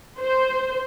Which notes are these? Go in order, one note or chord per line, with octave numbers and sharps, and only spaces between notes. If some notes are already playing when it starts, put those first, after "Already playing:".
C5